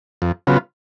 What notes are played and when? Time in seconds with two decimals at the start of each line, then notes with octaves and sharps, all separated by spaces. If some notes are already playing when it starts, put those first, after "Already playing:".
0.22 F2
0.47 C#3 F#3 B3 F4